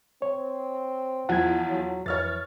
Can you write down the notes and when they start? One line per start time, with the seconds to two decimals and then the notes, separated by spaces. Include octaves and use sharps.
0.22 C4 C#5
1.29 E2 F3 F#5 G#6
1.68 F#3
2.06 F2 E3 C#5 F6 A6